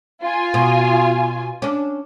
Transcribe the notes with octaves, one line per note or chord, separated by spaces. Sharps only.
F4 G#5
B2
C#4 D4